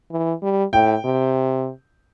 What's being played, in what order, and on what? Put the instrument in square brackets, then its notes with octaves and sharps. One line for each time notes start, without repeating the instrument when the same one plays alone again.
[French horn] E3
G3
[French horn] A2 [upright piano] G5
[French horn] C3